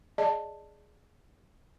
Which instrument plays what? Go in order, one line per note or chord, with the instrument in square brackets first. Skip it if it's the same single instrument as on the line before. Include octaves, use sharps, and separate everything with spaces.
[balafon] G#4 D5 D#5 A5